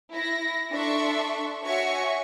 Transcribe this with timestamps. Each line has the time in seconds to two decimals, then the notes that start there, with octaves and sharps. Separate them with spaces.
0.13 E4 A#6
0.71 D4 A4 E5 C6 C#6
1.64 F#4 C#5 E5 G#5 C#6